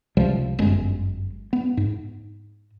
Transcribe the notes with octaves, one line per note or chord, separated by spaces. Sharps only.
C#2 C3 F3 G3
G1 F#2 G#3
B3
G#2